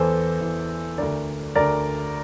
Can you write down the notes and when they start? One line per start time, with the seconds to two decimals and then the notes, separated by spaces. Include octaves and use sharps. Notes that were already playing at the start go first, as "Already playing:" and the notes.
Already playing: E2 E3 A4 C5
0.40 E2 E3
0.98 D2 D3 A#4 D5
1.55 D2 D3 A#4 D5